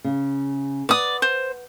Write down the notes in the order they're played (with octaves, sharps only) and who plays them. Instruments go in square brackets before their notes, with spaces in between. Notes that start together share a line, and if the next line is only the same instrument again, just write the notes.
[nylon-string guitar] C#3
[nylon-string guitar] B4 F#5 [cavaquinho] D5 D#6
[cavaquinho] C5